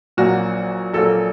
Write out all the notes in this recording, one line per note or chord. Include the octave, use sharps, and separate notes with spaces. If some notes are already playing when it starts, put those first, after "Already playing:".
A#1 A#2 F#3 A#3 F#4
A#1 A#2 F#3 A#3 A4